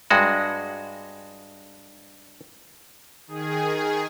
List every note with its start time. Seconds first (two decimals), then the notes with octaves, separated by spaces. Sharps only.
0.11 G2 G#3 F#4
3.27 D#3 G#4